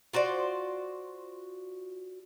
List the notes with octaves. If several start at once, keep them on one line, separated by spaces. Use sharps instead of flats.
F4 F#4 C5 D5